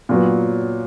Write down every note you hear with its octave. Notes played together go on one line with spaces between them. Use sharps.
A#2 F#3 B3